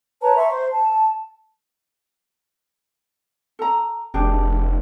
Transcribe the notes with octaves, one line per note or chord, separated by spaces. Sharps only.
B4 C#5 A5 A#5
E5 A#5 C6 C#6
C5
A5
A4 A#5
F1 D4 G4 G#4